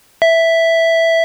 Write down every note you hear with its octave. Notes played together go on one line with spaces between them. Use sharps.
E5